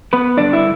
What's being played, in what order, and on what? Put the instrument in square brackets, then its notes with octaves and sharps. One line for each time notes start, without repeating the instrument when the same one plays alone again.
[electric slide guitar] B3 B4
G2 D3 G3 D4 D5
E4 E5